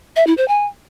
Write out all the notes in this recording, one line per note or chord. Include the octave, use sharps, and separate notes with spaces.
E5
E4
C5
G#5